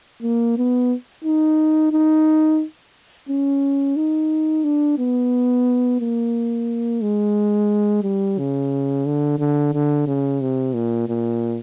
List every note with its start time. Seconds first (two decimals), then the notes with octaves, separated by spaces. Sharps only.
0.22 A#3
0.58 B3
1.24 D#4
1.92 D#4
3.29 C#4
3.97 D#4
4.64 D4
4.99 B3
6.00 A#3
7.01 G#3
8.03 G3
8.38 C#3
9.06 D3
9.39 D3
9.73 D3
10.07 C#3
10.41 C3
10.75 A#2
11.09 A#2